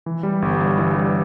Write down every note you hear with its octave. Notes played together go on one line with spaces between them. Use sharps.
E3
G3
G1
G2
E3
G3